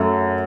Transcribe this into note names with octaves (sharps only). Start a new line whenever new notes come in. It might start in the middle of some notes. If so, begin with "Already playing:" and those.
Already playing: F#2 A3